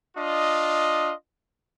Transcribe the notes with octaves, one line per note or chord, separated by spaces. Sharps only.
D4 F4 D#5